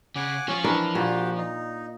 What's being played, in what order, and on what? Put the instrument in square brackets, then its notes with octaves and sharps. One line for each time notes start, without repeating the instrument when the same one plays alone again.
[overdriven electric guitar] C#3 [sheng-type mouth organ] F#5 G#5 D6
[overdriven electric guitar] F3 F4 [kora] C#4 [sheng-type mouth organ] C#6
[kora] E3 D4 A#4
[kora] A#2 [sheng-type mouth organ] F#4 G4
[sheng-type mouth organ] D#4